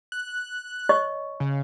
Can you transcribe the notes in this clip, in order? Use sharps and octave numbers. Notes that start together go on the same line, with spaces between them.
F#6
C#5 D#5 C#6
C#3